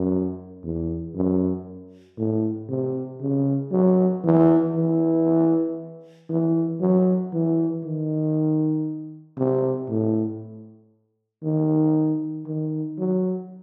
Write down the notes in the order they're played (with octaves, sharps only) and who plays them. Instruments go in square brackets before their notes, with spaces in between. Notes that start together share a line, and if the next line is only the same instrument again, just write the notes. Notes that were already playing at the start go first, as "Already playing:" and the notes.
Already playing: [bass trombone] F#2
E2
F#2
A2
C3
C#3
F#3
E3
E3
E3
F#3
E3
D#3
C3
A2
D#3
D#3
F#3